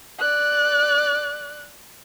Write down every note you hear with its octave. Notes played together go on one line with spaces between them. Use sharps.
D5 F#6